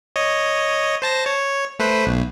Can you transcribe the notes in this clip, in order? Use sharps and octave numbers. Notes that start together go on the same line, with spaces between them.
C#5 D#5
C5 A5 A#6
C#5
A3 B4 C5
B1